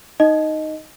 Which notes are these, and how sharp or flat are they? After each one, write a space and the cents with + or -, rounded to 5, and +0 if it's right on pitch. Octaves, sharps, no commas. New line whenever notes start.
D#4 +0 D#5 +0